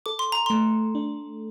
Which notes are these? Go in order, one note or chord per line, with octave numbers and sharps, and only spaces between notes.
A4 D6
C6
A#5
A3 C6
D4